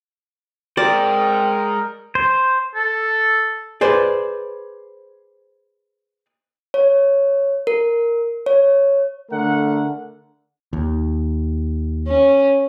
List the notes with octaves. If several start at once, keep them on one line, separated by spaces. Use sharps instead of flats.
G#3 C4 A#4 C5 D5
C5
A4
G#4 B4 C5 D5
C#5
A#4
C#5
D3 A3 A#4 F#5
D#2
C#4